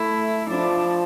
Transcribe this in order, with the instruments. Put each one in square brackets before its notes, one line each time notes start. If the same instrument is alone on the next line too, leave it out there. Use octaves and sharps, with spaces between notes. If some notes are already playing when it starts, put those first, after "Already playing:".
Already playing: [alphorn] A3 [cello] E4
[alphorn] F3 [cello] D4